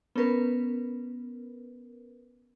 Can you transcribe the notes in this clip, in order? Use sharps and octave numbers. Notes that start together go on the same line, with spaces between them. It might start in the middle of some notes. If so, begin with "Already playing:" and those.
B3 C#4 A#4 B4